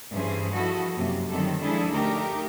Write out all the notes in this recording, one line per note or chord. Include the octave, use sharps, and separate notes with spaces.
G2 E3 C#4 G#4 C5
F3 E4 F#4 A4 D#5
F#2 C3 A#3 G4
D3 D#3 F#3 G3 C4 A4
F3 G#3 D4 E4 G#4 A4
D2 A3 D#4 G4 A#4